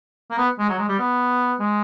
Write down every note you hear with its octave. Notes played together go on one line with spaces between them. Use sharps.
A#3
B3
G#3
F#3
G#3
G3
B3
G#3